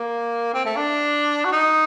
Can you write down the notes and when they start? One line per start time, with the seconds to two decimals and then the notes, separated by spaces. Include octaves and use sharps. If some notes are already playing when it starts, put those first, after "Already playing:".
Already playing: A#3
0.54 C4
0.65 A3
0.77 D4
1.45 F#4
1.52 D#4